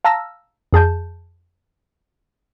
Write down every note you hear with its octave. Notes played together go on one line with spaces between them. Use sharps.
F5 A5 A#5 E6 F6 A#6
F2 G#4 A5 G6